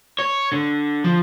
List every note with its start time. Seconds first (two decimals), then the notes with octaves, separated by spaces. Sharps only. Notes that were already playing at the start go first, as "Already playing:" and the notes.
0.19 C#5
0.52 D3
1.04 F3